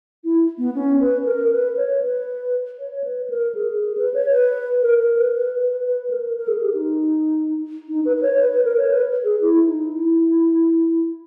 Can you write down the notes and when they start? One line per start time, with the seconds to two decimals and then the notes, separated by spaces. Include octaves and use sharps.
0.24 E4
0.58 B3
0.75 C#4
1.00 B4
1.26 A#4
1.51 B4
1.77 C#5
2.02 B4
2.79 C#5
3.04 B4
3.30 A#4
3.55 G#4
3.81 G#4
3.98 B4
4.14 C#5
4.31 B4
4.82 A#4
5.00 A#4
5.17 B4
5.33 B4
5.59 B4
5.84 B4
6.10 A#4
6.36 A#4
6.48 G#4
6.61 G4
6.74 D#4
7.89 D#4
8.05 B4
8.17 B4
8.22 C#5
8.39 B4
8.52 B4
8.65 A#4
8.78 C#5
8.91 B4
9.24 G#4
9.41 E4
9.67 D#4
9.93 E4